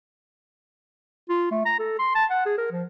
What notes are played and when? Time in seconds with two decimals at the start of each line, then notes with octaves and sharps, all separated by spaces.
1.29 F4
1.51 A3
1.66 A#5
1.79 A4
1.99 C6
2.15 A5
2.30 F#5
2.46 G#4
2.58 A#4
2.71 F3